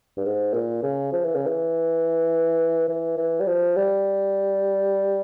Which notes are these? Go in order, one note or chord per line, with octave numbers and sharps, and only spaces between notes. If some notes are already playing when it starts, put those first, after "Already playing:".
G2
G#2
A#2
C#3
F3
E3
C#3
E3
E3
E3
G3
F3
G3